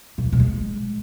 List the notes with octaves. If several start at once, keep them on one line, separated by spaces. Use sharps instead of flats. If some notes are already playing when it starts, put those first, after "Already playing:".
B2
E3
B2
G#3